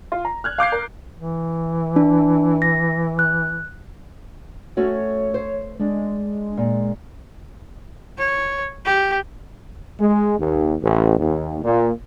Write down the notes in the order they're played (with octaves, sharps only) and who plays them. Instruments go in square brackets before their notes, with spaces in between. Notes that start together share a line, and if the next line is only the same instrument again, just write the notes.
[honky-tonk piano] F4
A#5
F6 F#6 G#6
F5 D6 G6 C7
A#4
[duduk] E3
[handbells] D4
A#6
F#6
[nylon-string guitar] A3 C#4 F#4 [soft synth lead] C#5
[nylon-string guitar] C5
[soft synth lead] G#3 [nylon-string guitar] D4
[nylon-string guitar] A#2
[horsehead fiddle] C#5
G4
[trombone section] G#3
D#2
A1
D#2
A#2